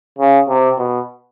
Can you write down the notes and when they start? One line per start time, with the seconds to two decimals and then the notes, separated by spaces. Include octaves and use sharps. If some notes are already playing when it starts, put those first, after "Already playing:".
0.18 C#3
0.49 C3
0.78 B2